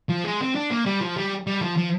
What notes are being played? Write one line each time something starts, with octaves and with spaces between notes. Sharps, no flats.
F3
G#3
C4
D4
A#3
G3
F3
G3
G3
F3
F3